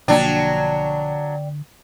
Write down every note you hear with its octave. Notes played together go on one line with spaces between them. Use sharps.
B1 D3 F3 F#3 A#3 D4 D5 G5